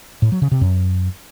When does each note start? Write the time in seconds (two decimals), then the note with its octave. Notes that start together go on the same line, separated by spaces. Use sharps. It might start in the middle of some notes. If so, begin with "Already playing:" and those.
0.22 A2
0.32 F#3
0.42 C#3
0.52 C3
0.61 F#2